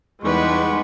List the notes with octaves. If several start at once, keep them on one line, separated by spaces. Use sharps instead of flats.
E2 G3 G#3 D#4 B4 F#5 C#6